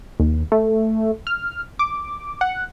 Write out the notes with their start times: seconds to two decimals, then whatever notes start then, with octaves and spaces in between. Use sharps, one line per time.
0.20 D#2
0.52 A3
1.27 F6
1.79 D6
2.41 F#5